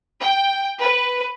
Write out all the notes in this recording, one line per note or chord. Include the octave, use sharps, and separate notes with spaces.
G5
B4